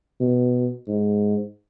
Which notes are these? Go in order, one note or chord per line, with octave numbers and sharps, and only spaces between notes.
B2
G#2